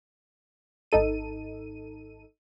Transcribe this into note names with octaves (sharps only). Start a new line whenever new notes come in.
G#1 D#4 A4 D#7